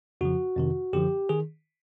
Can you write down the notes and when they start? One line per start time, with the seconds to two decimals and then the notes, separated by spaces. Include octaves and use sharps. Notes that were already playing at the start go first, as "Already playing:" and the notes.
0.21 F2 C#3 F3 F#4
0.57 F2 C3 D#3
0.93 F#2 D3 F3 G4
1.29 D#3 G#4